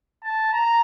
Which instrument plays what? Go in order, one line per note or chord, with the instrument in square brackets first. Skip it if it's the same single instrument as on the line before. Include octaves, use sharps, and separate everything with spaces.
[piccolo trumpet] A5
A#5